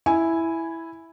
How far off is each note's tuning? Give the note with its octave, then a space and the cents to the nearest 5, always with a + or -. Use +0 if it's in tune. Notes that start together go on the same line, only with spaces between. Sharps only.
E4 +0 G#5 +0